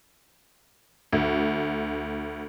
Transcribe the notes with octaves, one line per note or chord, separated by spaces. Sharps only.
D2